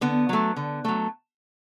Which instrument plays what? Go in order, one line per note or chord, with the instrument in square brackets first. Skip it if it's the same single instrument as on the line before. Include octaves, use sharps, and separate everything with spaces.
[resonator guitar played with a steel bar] D3 B3
F#3 A3
D3
F#3 A3